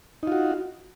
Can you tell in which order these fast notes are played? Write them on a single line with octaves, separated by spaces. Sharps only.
D#4 F4 F#4